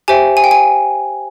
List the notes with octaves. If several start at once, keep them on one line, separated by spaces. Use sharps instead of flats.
G4 C5 E5 G5 G#5
G#5
G5
G#5